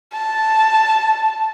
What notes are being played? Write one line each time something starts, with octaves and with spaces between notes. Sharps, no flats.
A5